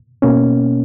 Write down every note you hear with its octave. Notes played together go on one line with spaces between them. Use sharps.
B2 A#3 C#4